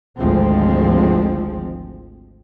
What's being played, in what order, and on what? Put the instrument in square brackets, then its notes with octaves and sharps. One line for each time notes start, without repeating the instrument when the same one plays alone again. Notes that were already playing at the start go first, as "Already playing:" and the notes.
[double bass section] G#1 D2 F3 G#3 C4